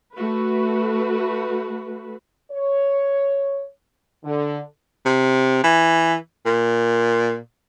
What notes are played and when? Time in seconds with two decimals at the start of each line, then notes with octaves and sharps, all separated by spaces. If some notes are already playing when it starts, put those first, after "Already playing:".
0.16 A3 F#4 B4
2.52 C#5
4.24 D3
5.06 C3
5.64 E3
6.46 A#2